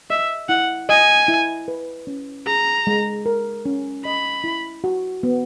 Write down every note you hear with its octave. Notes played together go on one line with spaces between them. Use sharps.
D#5 E5
E4 F#5
D#5 G#5
E4
B4
C#4
G#4 A#5
G#3
A#4
C#4
D#5 B5
E4
F#4
B3